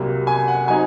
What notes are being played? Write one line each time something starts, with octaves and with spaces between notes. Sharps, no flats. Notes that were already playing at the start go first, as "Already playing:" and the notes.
Already playing: C2 C3 F#3 A#3
G#5
F#5
F#3 C4 D#4 G#5